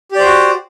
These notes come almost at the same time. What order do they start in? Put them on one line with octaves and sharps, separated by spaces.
G4 D5 C5 F#4